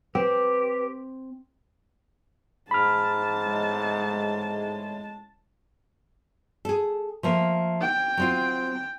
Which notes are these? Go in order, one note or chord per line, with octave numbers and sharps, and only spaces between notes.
C4 G4 B4
G#2 A5 B5 F6
A2 C#3 G#3
G#4 A4
F3 A3 A#3
G5
F#3 C4 F4